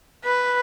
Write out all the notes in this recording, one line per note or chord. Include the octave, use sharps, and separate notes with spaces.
B4